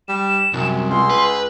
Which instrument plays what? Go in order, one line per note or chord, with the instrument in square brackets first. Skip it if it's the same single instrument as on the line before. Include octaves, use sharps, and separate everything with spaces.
[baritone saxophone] G3 [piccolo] E7
[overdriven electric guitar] C2 [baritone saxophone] F#2
[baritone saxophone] C#2 [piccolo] C6
[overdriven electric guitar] B4